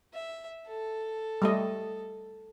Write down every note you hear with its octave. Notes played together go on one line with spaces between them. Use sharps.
E5
A4
G3 A3 D#5